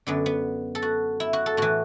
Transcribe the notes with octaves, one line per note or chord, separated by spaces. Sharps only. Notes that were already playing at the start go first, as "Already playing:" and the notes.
F#2 D3 B3
B3
A4
F#4
E4
F#4
A4
A2 E3 F#4